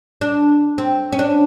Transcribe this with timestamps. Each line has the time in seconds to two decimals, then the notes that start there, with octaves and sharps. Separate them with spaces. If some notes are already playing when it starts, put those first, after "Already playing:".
0.21 D4
0.78 C4
1.12 C#4
1.19 D4